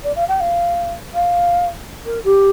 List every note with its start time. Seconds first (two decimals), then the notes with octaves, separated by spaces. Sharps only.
0.03 D5
0.15 F5
0.28 G5
0.40 F5
1.14 F5
2.05 A#4
2.24 G4